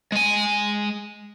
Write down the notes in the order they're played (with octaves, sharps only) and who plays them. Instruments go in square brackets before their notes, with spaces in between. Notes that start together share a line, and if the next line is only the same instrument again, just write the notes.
[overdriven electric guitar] G#3 G#5